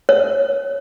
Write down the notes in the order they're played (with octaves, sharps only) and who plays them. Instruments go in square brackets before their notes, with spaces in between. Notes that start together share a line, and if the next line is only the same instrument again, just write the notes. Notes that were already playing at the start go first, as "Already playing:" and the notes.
[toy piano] C#5